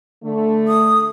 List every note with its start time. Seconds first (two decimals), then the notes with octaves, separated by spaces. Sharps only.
0.23 D3 A3
0.68 D#6